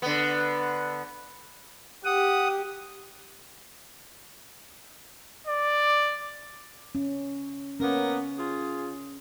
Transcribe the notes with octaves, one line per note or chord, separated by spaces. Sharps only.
D3 B3
G4 F#5 D#6
D5
C#4
A#3 B3 C#4 A#4
F4 G#4